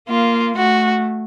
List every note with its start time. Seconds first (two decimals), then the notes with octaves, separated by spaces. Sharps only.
0.09 A#3 F4
0.57 A3 F#4